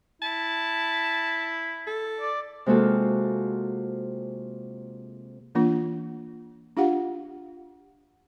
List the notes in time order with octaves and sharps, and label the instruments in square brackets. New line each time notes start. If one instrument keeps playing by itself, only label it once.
[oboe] E4 [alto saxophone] A5
[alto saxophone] A4
[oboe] D5
[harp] C3 G#3 A#3 F4 F#4 A4
[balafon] E3 A#3 D4 F4
D4 F4 G4 F5 F#5